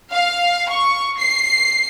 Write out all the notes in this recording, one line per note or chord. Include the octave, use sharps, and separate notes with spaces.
F5
C#6
C7